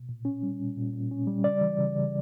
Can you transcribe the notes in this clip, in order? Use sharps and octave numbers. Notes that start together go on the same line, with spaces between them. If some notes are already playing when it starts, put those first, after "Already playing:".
Already playing: B2
A#2
C#4
G3
A#2
A#2
A#2
C#4
G3
C#3 D5
E3
C#3
C#3